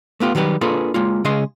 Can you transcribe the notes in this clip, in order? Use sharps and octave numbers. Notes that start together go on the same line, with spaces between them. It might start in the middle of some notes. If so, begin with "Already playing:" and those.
A3 B3 F4 G4
D#3 F#3 G3 G4 B4
A#3 D4 F4 G#4 A4 B4
G#3 A#3 F4
C#3 G#3 G#4 D#5 C6